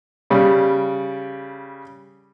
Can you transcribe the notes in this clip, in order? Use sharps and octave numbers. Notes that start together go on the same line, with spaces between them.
C#3 G3